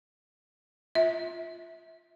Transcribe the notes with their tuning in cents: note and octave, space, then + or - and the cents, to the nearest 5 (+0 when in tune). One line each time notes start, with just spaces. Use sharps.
F4 +0 E5 -25